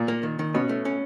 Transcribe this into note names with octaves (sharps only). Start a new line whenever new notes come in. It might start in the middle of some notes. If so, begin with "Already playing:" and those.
Already playing: A#2
A#3
D#3
D#3
B2 C#4
A3
C#4